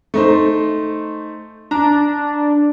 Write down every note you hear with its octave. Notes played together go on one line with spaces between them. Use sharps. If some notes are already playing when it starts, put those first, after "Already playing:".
A3 D#4 C5
D4 A#5